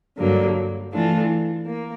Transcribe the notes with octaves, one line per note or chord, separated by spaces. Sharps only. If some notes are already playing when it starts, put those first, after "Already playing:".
G2 D3 F#3 A#3
E3 A3 D4 F4
A#3